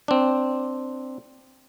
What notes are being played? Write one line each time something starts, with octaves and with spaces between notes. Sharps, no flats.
C4 D4